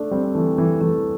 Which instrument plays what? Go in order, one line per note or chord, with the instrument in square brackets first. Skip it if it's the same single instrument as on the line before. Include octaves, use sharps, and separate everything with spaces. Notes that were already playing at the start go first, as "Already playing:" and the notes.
Already playing: [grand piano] A3 D4
G3 C4
C4
E3 A3
E3 A3
E3 A3